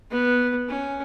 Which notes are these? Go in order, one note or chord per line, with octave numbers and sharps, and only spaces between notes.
B3
C#4